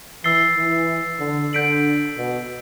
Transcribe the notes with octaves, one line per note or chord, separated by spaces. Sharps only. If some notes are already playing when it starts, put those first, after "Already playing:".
E3 E6 A6 C7 G7
E3
D3
D3 G6 B6 D7 F#7
B2